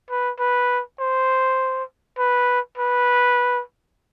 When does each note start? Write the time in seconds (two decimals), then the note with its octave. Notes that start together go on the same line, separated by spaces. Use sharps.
0.10 B4
0.39 B4
1.00 C5
2.19 B4
2.78 B4